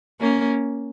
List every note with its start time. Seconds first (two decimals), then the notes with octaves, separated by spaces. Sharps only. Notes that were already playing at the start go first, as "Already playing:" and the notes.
0.20 A#3 C#4